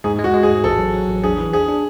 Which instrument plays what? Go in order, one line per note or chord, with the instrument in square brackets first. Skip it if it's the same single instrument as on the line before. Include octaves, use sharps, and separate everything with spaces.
[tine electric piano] G#2 [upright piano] G#4
[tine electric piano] G#3
[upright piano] F#4
[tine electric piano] G#3
[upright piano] G#4
[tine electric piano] G#2
[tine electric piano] A1 [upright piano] A4
[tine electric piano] F#3
F#3
A1
[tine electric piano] D4 [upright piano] G#4
[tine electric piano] E3
[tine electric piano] D4 [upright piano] G#4
[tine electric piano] D4